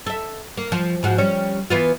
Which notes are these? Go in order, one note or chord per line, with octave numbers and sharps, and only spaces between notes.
A4 E5
A#3
F3
G#2 F3 F#4
G3 C#4 C#5
E3 B3 F4